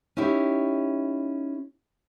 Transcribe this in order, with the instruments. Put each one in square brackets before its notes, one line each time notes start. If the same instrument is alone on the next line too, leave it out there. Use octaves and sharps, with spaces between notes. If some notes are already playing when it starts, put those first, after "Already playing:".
[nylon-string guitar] C#4 D#4 E4 G4